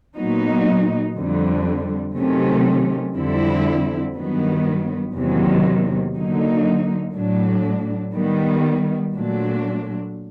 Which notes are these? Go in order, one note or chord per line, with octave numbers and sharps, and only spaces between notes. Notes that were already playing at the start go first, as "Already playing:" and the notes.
A#2 F#3 B3 D#4
F2 D3 G3
C3 D#3 F#3 A3 C#4
F2 D3 G3 C4 E4
G2 D#3 F#3 B3
E2 C3 D#3 F#3 A#3
D3 F#3 A#3 D#4
A2 F#3 A3 D4
D#3 G3 B3
A#2 F#3 A3 D4